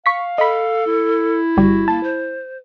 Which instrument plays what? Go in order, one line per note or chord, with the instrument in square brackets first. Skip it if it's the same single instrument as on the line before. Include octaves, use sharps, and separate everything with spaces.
[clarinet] F5 [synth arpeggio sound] C#6 B6
[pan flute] A4 [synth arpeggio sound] D#5 B5
[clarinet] E4
[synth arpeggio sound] G1 G3 [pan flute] F#4
[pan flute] A#3 [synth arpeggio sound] A5
[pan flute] C5